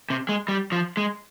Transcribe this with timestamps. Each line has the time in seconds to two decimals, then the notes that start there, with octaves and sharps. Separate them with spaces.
0.10 C3
0.29 G#3
0.48 G3
0.72 F3
0.97 G#3